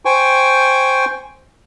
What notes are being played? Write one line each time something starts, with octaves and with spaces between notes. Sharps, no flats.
C5 G5 G#5 C#6